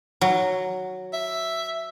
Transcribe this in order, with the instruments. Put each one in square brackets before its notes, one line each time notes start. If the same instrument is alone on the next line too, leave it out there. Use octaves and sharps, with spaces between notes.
[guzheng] F#3
[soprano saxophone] E5